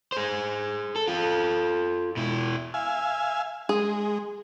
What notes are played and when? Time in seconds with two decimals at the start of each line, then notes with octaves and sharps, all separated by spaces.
0.12 G#4 C5
0.96 A4
1.08 F4 A4
2.17 B2 E4
2.74 E5 F5 G#5
3.69 G#3 G#4